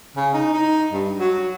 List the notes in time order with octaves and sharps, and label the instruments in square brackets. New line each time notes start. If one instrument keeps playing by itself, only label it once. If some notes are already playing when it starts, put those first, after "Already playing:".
[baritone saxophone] C#3
D#4
D#4
G2
F#3